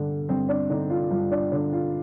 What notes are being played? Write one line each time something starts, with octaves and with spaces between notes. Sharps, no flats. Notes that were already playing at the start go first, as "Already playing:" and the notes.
Already playing: G2 D3
G2 C4
D4
D3 D#4
F4
G2 F4
D4
D3 D4
F4